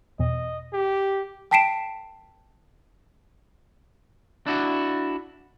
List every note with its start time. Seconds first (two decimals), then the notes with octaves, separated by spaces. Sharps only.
0.19 E2 B2 D#5
0.73 G4
1.51 G5 A5 B6 C7 D7 E7
4.46 D4 E4 F#4